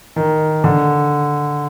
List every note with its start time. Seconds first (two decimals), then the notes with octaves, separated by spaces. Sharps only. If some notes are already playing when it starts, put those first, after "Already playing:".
0.16 D#3
0.64 D3